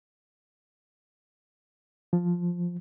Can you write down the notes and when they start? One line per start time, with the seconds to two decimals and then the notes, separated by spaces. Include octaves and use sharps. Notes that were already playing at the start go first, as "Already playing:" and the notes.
2.13 F3